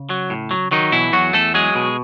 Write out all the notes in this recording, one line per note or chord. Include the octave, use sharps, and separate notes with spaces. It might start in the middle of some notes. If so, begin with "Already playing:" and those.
Already playing: C#3
F#3
A2
F#3
D#3 F#3 D#4
B2 E3 E4
E2 F#3 F#4
E2 A3 A4
F#3 G#3 G#4
B2